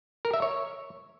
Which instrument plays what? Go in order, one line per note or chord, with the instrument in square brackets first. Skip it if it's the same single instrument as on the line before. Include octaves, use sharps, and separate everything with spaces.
[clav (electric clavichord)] A#4
E5
C#5